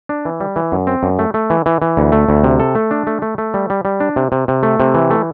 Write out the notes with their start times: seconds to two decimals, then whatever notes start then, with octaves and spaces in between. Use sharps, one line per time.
0.09 D4
0.25 E3
0.40 G3
0.56 E3
0.72 F#2
0.87 C4
1.03 F#2
1.19 A3
1.34 A3
1.50 E3
1.66 E3
1.82 E3
1.97 D2
2.12 A3
2.29 D2
2.44 C3
2.60 A4
2.75 A3
2.91 D4
3.07 A3
3.22 A3
3.38 A3
3.54 G3
3.70 G3
3.85 G3
4.00 D4
4.16 C3
4.32 C3
4.48 C3
4.63 A3
4.80 C3
4.94 E3
5.10 A3